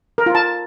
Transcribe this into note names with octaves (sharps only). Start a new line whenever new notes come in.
A#4
F4
A5